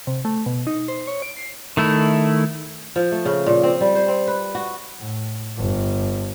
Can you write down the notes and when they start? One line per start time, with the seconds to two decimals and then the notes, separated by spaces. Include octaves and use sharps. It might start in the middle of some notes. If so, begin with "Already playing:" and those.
0.07 C3
0.25 A3
0.46 B2
0.67 D#4
0.88 C5
1.07 C#5
1.22 D7
1.37 C7
1.77 D#3 A3 E4
2.96 F3
3.12 A3
3.25 C#3
3.46 A#2
3.63 C4
3.81 G3
3.95 C5
4.08 C4
4.27 B4
4.55 F#4
4.99 A2
5.57 G1